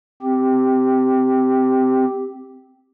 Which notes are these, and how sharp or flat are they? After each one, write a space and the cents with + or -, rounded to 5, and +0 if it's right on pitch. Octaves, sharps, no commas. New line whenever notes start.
C4 -10 G4 +0